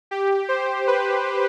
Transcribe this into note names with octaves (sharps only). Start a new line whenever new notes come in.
G4
C5
B4